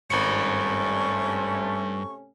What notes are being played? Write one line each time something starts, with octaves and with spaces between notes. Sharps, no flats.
G#1 G2 C3 A3 C#4 B5 C#6 C#7